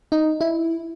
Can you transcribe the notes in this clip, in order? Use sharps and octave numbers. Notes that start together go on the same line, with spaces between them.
D#4
E4